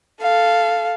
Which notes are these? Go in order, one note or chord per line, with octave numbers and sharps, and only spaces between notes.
A4 F5